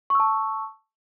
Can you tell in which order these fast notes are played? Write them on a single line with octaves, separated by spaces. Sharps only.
C#6 E6 A5